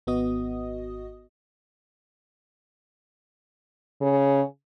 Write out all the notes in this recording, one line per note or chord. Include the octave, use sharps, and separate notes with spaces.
G#1 B3 F#4 D#5 D#6
C#3